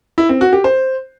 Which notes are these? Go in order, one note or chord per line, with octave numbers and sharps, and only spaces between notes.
E4
C4
F#4
G4
C5